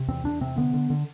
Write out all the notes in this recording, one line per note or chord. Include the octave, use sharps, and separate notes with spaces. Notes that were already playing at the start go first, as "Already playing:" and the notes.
Already playing: C3
E2 C4
E2 D4
C3 C4
D3 B3
D3
D3